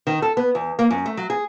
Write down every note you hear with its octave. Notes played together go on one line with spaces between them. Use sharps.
D#3
A4
B3
E2
A#3
F#2
A3
F#3
G#4